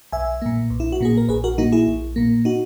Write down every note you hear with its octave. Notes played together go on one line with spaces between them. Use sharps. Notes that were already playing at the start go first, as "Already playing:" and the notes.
B1 E5 G#5
A#2 A#3
B1
E4
F#4
A#2 A#3 G#4
A#4
A#1 G#4 B4
F#4 A#4
A#2 A#3 D#4 F#4
E4 G#4
A#1
A#2 A#3
D#4 F#4